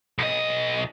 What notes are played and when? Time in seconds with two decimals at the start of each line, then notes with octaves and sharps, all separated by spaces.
0.18 B1 D#5